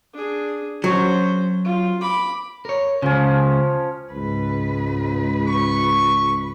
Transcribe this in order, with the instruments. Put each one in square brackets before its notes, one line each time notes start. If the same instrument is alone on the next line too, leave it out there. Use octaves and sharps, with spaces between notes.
[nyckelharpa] D4 G#4
[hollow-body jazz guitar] F#3 [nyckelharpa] C#4 C5
[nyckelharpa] F4
B5 D6
[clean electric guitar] A#4 C#5
[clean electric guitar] C#2 C#3 [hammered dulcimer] F3 C#4
[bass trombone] C#2 [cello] G#2 B4
[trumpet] C#6